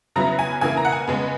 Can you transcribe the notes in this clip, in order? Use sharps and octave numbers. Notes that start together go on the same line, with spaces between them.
C#3 F#3 B3 E4 A#5
G#5
C#3 E3 A#3 E4 G#5
A#5
F#5
G#5
C#3 G#3 B3